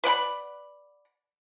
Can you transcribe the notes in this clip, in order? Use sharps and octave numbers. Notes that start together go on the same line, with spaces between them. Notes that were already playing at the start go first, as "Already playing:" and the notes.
B4 D5 F#5 B5